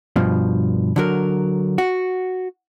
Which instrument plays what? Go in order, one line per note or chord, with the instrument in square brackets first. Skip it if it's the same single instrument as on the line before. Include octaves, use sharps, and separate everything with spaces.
[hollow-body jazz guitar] G2 B2 F3
D3 F#3 A#4
F#4